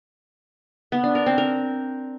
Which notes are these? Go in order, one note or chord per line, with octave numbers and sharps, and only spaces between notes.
B3
D4
A#4
C4
A#4